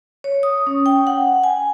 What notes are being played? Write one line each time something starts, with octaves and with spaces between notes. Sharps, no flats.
C#5
D#6
C#4
G5
F#5
G#5